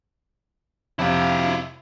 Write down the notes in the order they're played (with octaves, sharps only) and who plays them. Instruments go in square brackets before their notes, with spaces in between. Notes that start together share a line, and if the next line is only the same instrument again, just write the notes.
[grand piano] F2 C3 [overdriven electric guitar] E4 F5